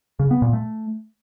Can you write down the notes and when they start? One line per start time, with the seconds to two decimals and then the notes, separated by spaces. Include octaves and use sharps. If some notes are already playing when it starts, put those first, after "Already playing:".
0.19 C#3
0.31 B3
0.42 A#2
0.53 A3